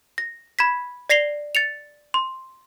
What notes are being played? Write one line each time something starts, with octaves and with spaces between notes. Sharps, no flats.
A#6
B5 G#6 B6
D5 A#6 C7 F7 G7
A6 C#7 F7
C6